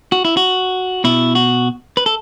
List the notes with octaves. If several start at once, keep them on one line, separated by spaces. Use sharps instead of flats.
F#4
E4
F#4
B2 E4
F#4
B4
A4